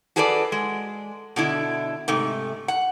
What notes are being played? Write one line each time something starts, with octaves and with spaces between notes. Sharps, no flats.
F#4 G#4 A4 B4 C#5 D5
G#3
B2 D3 E4
G#2 C3 A3
F#5